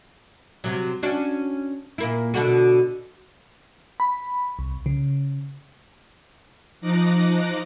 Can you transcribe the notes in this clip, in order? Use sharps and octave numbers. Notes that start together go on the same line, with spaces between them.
C3 F#3
C#4 D4 F#4
A#2 A#3 E4
B2 D3 F#4
B5
C2
C#3
F3 D#4 D6 F#6 A#6